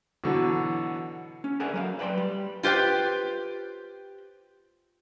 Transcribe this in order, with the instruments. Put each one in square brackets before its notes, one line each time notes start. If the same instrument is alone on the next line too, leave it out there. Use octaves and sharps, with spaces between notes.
[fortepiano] B2 D3 E3 F#3
[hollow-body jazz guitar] C#4
G#4 A#4 D5 E5 F#5 G#5
F#3 A#4 F5
B4 D5 G5 A#5 C6
G3
[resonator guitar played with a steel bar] F4 G4 B4 C5 G5